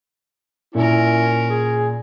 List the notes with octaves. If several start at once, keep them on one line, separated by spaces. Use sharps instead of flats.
A#2 C#4 D#4 E4 A#4
G#4